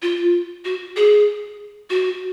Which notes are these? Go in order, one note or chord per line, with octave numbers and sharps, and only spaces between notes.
F4
F#4
G#4
F#4